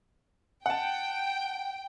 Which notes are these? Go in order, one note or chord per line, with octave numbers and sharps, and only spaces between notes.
F#5 G5 A5